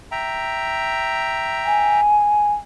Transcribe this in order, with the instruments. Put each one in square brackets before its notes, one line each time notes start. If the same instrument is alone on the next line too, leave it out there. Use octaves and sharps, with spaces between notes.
[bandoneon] E5 G5 A#5
[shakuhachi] G#5